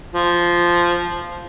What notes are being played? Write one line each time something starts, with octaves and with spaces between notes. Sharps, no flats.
F3